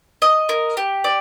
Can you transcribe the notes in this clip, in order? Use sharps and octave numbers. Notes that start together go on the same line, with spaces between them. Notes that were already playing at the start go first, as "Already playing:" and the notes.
D#5
A#4
G4
D5